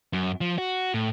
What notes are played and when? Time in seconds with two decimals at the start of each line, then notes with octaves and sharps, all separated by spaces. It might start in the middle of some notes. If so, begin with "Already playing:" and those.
0.13 F#2
0.41 F3
0.58 F#4
0.94 A2